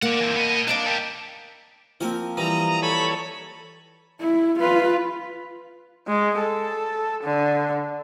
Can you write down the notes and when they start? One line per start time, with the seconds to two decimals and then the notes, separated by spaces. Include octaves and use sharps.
0.02 A#3 D5 F#5
0.20 E3 C4
0.36 B3 D#5
0.68 D4 A#4 D5 D#5 F5
0.86 G4 A4
2.01 F3 A#3 C4 A#4 G#5
2.37 E3 G3 A#5 D#6
2.83 A4 C#5 B5
4.21 E4
4.60 F4 B4
6.08 G#3
6.39 A4
7.24 D3